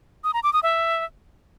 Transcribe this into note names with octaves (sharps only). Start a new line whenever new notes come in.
D#6
A#5
D6
D#6
E5